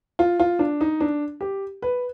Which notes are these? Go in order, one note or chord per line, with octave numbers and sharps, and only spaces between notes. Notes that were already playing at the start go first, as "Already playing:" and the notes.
F4
F4
D4
D#4
D4
G4
B4